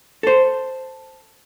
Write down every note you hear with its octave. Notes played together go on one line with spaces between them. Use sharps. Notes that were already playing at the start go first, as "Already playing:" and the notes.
A4 C5